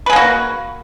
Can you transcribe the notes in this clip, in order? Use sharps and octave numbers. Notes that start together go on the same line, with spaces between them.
A#3 F#4 G#4 B4